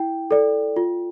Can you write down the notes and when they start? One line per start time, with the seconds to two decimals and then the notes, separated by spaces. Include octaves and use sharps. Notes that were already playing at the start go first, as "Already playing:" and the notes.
Already playing: E4 G5
0.31 A4 D5
0.76 F4